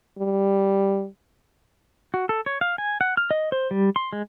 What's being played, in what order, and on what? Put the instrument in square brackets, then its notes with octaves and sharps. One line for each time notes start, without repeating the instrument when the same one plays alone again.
[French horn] G3
[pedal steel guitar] F#4
A4
C#5
F5
G#5
F#5
F6
D#5
C5
G3
C6
G#3